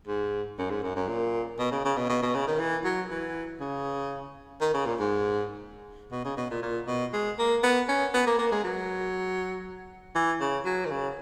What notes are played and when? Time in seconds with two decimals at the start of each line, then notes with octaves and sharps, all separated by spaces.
0.07 G#2
0.58 F#2
0.70 G#2
0.83 F#2
0.96 F#2
1.08 A#2
1.59 B2
1.71 C#3
1.85 C#3
1.97 B2
2.09 B2
2.22 B2
2.34 C#3
2.47 D#3
2.59 E3
2.84 F#3
3.10 E3
3.60 C#3
4.61 D#3
4.74 C#3
4.86 A#2
4.99 G#2
6.12 B2
6.25 C#3
6.37 B2
6.50 A#2
6.62 A#2
6.87 B2
7.13 G#3
7.39 A#3
7.63 B3
7.88 C#4
8.14 B3
8.27 A#3
8.38 A#3
8.52 G#3
8.64 F#3
10.15 E3
10.41 C#3
10.65 F#3
10.86 D#3
10.91 C#3